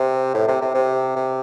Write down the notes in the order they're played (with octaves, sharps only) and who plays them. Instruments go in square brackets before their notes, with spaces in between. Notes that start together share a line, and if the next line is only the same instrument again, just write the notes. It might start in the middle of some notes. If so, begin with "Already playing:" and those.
Already playing: [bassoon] C3
A2
C3
C3
C3
C3